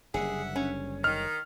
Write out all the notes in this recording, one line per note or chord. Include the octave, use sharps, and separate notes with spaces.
F#1 D3 G3 G#4 E5 F#5
C#4
D#3 F6